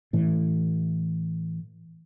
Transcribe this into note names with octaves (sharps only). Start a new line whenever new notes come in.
A2 E3